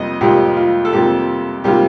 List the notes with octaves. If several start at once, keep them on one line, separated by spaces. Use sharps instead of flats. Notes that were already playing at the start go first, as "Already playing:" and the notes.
Already playing: F2 C3 G3 A#3 D#5
F2 C3 G3 A#3 F4 G4
F4
A4
F2 C3 G3 A#3 F4 G4
C3 G3 A#3 F4 G4